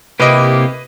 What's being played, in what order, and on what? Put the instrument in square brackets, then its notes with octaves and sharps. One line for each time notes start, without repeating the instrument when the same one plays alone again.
[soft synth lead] C3 [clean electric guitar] A#3 E4 G4 [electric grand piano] B4 D#5